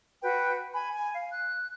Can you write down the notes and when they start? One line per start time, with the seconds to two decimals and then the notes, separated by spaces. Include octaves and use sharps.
0.23 F#4 B4 G5
0.73 G#5 B5
0.92 G#5
1.13 F5
1.32 F#6